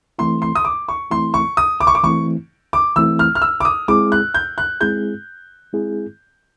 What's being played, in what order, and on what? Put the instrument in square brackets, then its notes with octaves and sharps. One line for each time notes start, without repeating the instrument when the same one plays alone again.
[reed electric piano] E3 A3 C4 E4 [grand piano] C6
[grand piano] C6
D#6
D6
C#6
[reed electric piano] E3 A3 C4 E4 [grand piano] C6
[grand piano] C#6
D#6
D6
C#6
D6
[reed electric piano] E3 A3 C4 E4 [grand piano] C#6
[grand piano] D6
[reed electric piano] E3 A3 C4 E4 [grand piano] E6
[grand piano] F6
F6
E6
D6
D#6
[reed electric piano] G#3 C4 E4 G#4 [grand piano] D6
[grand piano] F#6
G6
F#6
[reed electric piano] G#3 C4 E4 G#4 [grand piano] G6
[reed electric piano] G#3 C4 E4 G#4